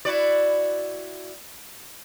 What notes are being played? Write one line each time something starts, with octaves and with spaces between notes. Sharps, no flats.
E4 F#4 D5